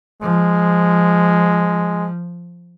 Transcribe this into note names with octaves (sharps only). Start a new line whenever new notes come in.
F3 G#3